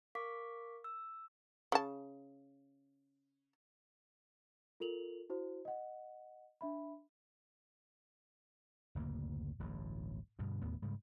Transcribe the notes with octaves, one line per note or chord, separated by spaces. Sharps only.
A#4 F5 C#6 D6 B6
E6
C#3 A5
F4 A4 A#4 F7 F#7
E4 F#4 C5
D#5 F#5
D4 E5 B5
F#1 D2 A2 A#3
D1 A1 G2
G2 B2 D3
E1 D#2 A2 B3
G#2 C#3 G3